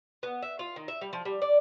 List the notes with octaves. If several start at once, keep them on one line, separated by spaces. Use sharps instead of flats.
B3
E5
F4
D#3
E5
G3
F3
G3
D5